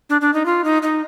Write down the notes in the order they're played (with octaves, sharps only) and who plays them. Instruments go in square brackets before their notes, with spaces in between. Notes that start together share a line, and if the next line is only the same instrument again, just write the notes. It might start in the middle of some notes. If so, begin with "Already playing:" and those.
[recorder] D4
D4
D#4
F4
D#4
D#4